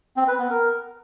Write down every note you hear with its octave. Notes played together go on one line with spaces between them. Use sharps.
C4
B4
B3
A#4